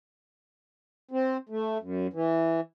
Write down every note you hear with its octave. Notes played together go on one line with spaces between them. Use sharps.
C4
A3
F#2
E3